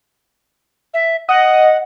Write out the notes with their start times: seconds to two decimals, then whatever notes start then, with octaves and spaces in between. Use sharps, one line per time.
0.94 E5
1.29 D#5 F#5